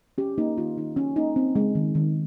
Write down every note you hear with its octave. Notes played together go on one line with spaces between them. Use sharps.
C#4 G4
A#3 D#4
D#3 F4
D#3 D#4
C#4
A#3 D#4
C4
G#3
D#3
D#3